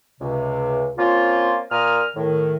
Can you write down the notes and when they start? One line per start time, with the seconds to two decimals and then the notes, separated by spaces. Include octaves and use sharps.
0.21 C#2 C3
0.98 A#3 C4 C#4 F4
1.71 A#2 A#4 A#5 D#6 F6
2.16 A2 D#3